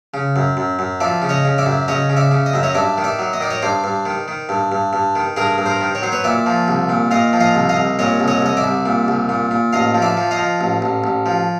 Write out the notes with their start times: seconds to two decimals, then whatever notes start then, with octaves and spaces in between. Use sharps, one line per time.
0.14 C#3
0.36 F#2
0.57 F#2
0.79 F#2
1.00 F3 D5 E5
1.22 C#3
1.29 C#5 D#5
1.44 C#3
1.58 D5 E5
1.66 F#2
1.88 C#3 C#5 D#5
2.09 C#3
2.17 D5 E5
2.31 C#3
2.46 D#5
2.54 F#2 E5
2.63 C#5 D#5
2.75 G2 D5 E5
2.98 D#3
3.04 D5 E5
3.19 F#3
3.33 D#5
3.40 D#3 D5
3.51 C#5 D#5
3.62 G2 C5 D5
3.84 G2
4.05 D#3
4.28 D#3
4.49 G2
4.72 G2
4.93 G2
5.15 D#3
5.37 G2 G#4 A#4
5.58 G2
5.66 A#4 C5
5.81 D#3
5.95 C#5
6.02 F#3 C5
6.12 B4 C#5
6.24 A#2 D5 E5
6.46 F3
6.68 C2
6.89 A#2
7.11 A#2 D#5 F5
7.33 F3
7.40 D#5 F5
7.55 C2
7.69 D#5 F5
7.77 C2
7.99 A#2 C#5 D#5
8.20 C2
8.28 C#5 D#5
8.42 C2 D#5
8.57 D5 E5
8.64 C2
8.86 A#2
9.08 C2
9.29 A#2
9.51 A#2
9.73 A1 D#5 F5
9.94 F3
10.02 D5 E5
10.17 F3
10.31 D#5 F5
10.39 F3
10.61 A1
10.82 A1
11.04 A1
11.26 F3